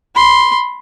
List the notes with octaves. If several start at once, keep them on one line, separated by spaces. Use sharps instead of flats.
B5 C6